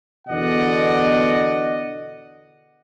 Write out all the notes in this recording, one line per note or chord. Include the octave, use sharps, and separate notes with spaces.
E2 B2 D3 D5 D#5 F#5